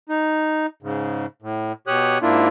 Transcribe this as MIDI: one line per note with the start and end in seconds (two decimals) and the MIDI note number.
0.09 0.66 63
0.83 1.26 44
0.83 1.26 49
1.42 1.72 45
1.87 2.18 47
1.87 2.18 67
1.87 2.18 73
1.87 2.18 87
1.87 2.18 90
2.22 2.48 44
2.22 2.48 58
2.22 2.48 62
2.22 2.48 64
2.22 2.48 65